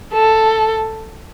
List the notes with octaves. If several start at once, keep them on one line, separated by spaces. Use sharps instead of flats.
A4